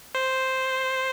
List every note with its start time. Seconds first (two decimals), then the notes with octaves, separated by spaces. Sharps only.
0.15 C5